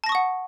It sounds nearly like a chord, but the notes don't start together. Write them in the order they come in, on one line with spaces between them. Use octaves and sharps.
A5 A#6 C#6 D#6 F#5